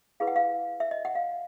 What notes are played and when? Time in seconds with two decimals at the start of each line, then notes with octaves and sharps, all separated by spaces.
0.20 E4 G#4 B4 F5
0.27 F#5
0.36 F5
0.80 E5
0.91 D#5
1.05 F#5
1.15 F5